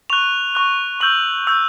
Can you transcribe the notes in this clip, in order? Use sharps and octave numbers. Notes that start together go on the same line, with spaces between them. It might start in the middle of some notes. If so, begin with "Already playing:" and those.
C#6 F#6 F7
C#6 F#6
C#6 E6 G6 F#7
C#6 E6 G6